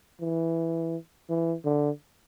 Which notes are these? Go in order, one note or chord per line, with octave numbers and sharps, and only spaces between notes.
E3
E3
D3